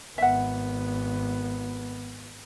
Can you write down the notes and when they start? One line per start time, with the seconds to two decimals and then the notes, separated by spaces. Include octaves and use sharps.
0.18 G#1 B3 E5 F#5